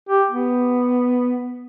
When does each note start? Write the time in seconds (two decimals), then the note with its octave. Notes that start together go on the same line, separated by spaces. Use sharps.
0.09 G4
0.31 B3